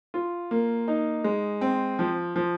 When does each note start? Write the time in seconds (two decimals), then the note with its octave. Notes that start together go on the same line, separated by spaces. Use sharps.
0.14 F4
0.51 A#3
0.88 D#4
1.24 G#3
1.61 C4
1.99 F3
2.36 F3